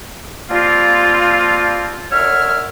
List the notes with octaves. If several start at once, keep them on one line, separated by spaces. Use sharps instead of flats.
F3 G3 A#3 C4 F4
F#2 D3 C#5 E5 F6